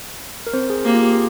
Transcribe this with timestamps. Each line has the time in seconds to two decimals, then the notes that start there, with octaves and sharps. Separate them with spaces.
0.47 A#4
0.53 C4 C5
0.70 G#4
0.85 A#3 G4
0.94 F4
1.02 G4
1.10 G#4